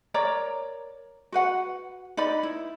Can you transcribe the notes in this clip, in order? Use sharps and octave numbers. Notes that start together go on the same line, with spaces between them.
A#4 C#5 D5 A#5
F#4 B4 F#5
D#4 B4 D5 B5
E4